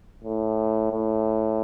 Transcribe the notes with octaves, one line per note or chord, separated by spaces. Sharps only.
A2
A2